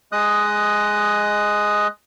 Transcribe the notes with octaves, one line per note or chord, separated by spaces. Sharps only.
G#3 D#5 D#6 F#6